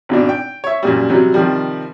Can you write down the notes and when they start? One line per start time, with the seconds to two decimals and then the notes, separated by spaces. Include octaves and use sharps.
0.09 G#1 B2 D4
0.29 G5
0.64 C#5 E5
0.83 F#2 A#2 G3
1.09 C3 F#3 G3
1.34 C3 D#3 F3 G3